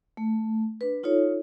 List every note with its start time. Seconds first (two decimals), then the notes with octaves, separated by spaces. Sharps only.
0.17 A3
0.81 D4 B4
1.03 D#4 F4 A4 C#5